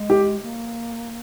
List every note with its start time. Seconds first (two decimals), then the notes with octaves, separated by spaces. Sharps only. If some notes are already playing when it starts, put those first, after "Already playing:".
Already playing: G#3
0.10 G4
0.42 A#3